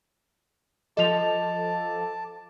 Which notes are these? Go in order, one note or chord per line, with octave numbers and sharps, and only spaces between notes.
F3 A4 D#5 A5 D6 F7